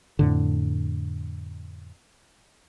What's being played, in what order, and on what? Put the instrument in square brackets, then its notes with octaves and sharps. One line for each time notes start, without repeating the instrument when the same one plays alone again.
[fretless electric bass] F2 A2 D3